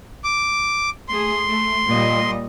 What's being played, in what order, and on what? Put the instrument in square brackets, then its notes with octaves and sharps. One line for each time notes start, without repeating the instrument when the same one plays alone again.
[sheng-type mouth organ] D6
[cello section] A3 G#4 [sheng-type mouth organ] C6
[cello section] A3
A#2 G3 D#5